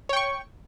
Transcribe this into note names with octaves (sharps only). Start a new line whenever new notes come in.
C#5 G5 C#6